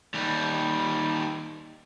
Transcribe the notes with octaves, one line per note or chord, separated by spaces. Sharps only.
D#2 G3